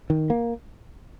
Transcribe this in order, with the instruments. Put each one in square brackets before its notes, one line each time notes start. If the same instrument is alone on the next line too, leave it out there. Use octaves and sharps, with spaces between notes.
[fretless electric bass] D#3
A#3